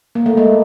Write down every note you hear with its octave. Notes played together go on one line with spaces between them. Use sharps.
A#3
A3
G#3 A#3